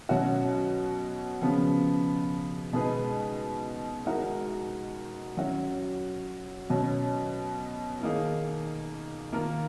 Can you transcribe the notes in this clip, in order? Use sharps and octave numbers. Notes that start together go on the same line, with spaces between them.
B2 F#3 C#4 F#4
C#3 F3 B3
B2 G#3 D#4 G#4 B4
G#3 D#4 F#4 A#4
F#3 C#4 F#4
B2 F#3 C#4
D#3 A#3 D#4 G#4
D#3 A#3 F4 A#4